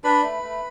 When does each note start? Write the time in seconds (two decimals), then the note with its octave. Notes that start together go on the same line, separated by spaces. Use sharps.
0.04 D4 B4 B5
0.23 A3
0.43 A3